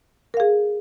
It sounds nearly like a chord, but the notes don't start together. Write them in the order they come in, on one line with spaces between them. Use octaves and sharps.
A#4 F5 G#4